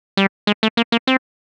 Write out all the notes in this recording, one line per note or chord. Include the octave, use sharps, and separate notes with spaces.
G3
G#3
A3
A#3
A#3
C4